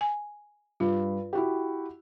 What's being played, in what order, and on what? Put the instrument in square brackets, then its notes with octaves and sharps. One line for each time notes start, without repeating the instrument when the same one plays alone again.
[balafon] G#5
[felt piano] G2 [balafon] F4
[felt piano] E4 F#4 G4